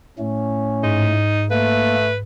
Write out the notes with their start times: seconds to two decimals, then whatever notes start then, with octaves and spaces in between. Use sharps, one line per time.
0.19 A2 A3 C#4
0.83 G#2 D#4
1.51 A3 A#3 B4